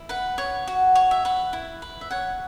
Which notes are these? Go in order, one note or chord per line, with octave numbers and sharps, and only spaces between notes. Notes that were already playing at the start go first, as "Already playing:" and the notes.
Already playing: E4
B4 F#5
C#5 F#5
F#4
C#5
E5
B4 F#5
E4
B4
E5
C#5 F#5